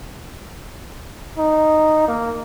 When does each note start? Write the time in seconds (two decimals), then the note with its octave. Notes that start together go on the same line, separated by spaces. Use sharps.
1.38 D#4
2.08 A#3